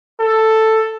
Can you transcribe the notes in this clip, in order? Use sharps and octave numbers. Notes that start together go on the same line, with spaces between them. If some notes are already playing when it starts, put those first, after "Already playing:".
A4